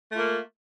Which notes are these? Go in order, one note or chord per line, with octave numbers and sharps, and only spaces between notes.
A3 A#3 F4